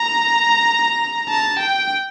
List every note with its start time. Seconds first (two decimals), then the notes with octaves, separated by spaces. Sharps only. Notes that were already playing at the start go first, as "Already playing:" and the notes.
Already playing: A#5
1.29 A5
1.59 G5